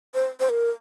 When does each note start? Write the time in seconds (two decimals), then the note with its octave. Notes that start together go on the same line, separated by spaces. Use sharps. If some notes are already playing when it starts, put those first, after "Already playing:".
0.14 C5
0.40 C5
0.49 A#4